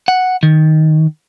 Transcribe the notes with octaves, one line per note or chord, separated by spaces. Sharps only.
F#5
D#3